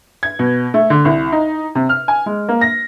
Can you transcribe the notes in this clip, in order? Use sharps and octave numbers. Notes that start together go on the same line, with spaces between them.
G#6
B2
A3
D3
C2
D#4
C3
F6
G#5
G#3
A#3
A#6